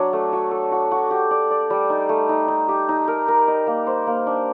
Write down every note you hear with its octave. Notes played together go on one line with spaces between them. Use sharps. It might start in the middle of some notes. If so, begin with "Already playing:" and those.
Already playing: F#3 D4
A3
F#4
A4
F#4
F#4
G4
D5
D5
G3
D#4
A3
D#4
D#4
G4
D#4
A#4
A#4
D#5
A#3
C5
A#3
D4